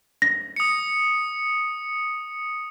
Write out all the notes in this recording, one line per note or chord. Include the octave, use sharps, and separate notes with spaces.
A#6
D#6 C#7